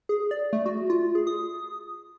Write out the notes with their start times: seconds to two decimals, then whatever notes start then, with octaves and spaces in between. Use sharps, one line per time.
0.09 G#4
0.31 D5
0.53 A3
0.66 F#4
0.90 F4
1.15 G#4
1.27 D#6